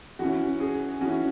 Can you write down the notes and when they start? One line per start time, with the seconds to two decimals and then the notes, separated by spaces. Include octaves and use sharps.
0.19 E3 C#4 F#4
0.60 G#4
1.01 E3 C#4 F#4